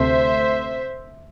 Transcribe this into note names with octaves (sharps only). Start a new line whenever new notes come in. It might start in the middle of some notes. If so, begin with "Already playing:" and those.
Already playing: D2 C3 A3 C5 E5